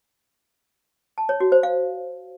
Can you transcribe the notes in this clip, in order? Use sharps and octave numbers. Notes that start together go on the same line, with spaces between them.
A5
C#5
F#4
C5
F5